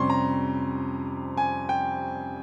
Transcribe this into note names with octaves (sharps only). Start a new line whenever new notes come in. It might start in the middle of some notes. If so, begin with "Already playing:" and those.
Already playing: F2 C3 G3 C#4 C6 C#6
A#5
G#5
G5